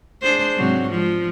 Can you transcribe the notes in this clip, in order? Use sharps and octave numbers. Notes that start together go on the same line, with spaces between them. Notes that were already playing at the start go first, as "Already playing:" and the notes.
D4 G#4 C5
G#2 C3 F#3
F3 G#3